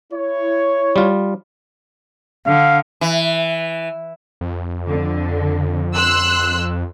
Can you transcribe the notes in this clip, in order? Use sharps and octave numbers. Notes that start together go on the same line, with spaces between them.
E4 C#5
G3 F4
D3 F5
E3
F2
D3
C6 E6 F#6